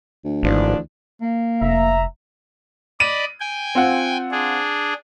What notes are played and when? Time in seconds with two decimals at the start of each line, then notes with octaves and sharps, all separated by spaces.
0.24 D2
0.43 G#1 E3 F3 D4
1.22 A#3
1.62 F1 E5 A#5
3.00 D5 D#5 B5 D#7
3.40 G5 G#5
3.75 C4 F4 F#5
4.31 D4 G#4